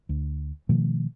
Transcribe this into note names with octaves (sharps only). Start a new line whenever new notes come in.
D2
B2 D#3 F3 A3